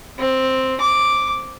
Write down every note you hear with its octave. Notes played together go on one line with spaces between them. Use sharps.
C4
D6